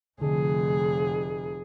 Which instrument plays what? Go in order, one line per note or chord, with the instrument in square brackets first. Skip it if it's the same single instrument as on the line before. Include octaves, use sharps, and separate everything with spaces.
[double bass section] F1 [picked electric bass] D3 [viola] G#4